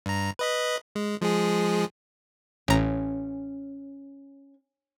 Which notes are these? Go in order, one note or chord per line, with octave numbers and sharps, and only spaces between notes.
G2 A#5
B4 D#5 B5
G#3
F3 G#3 G#4
A1 C#4 A#5